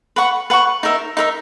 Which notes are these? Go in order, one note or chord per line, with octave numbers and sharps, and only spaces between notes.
B4 F#5 C#6
B4 F#5 C#6
D#4 A#4 E5
D#4 A#4 E5